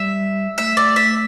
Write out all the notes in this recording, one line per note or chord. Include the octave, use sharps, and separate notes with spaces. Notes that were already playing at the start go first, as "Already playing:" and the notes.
Already playing: G3 E5
A3 E5
D5
E5